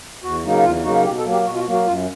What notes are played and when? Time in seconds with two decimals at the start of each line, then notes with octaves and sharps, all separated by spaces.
0.23 E2 F#4
0.44 C#3 F#3 A#3 D#4
0.64 E2 F4
0.84 C#3 F#3 A#3 D#4 F#4
1.05 B2 G4
1.18 A4
1.25 F#3 A#3
1.32 G4
1.45 B2 F#4
1.54 F4
1.59 F#4
1.66 F#3 A#3
1.73 F#4
1.86 F#2 F4